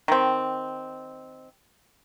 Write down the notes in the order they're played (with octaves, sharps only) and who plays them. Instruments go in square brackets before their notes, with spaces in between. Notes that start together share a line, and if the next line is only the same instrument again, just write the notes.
[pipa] D#3 C4